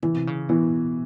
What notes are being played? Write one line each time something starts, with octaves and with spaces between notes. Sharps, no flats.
C#3 E3
C3
C#3
B2 E3